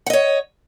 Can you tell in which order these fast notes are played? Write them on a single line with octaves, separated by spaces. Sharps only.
F#5 D#5 C#5